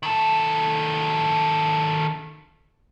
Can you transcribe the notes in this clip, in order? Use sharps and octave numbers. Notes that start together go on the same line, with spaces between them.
D#3 A4